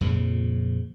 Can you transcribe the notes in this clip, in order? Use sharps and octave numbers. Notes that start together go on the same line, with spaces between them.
F2 A#2 C#3 F3